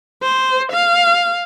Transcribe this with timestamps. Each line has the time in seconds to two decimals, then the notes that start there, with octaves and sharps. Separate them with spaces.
0.23 C5
0.72 F5